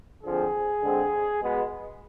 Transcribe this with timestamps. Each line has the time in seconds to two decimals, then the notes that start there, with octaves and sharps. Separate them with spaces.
0.23 D3 F3 C4 G#4
0.83 D3 G#3 C4
1.42 B2 G#3 B3